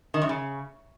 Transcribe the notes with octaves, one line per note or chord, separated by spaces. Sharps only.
D#3
F#2
C#3